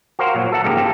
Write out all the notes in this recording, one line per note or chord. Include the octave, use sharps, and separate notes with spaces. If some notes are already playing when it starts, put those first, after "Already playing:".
F#4 A#4 C5 F5 F#5
A#2 F#3
A4 E5 F#5 A5 A#5
G#2 C#3 F3 A#3 G4
A3 A#3 C4 A4